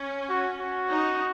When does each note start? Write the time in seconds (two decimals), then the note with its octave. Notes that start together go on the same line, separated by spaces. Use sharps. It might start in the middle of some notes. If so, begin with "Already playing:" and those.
Already playing: C#4
0.29 F#4
0.60 F#4
0.90 D#4